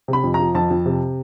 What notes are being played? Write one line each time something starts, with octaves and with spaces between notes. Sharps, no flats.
C3
B5
F2
F3 A#5
F2 A5
F2
C3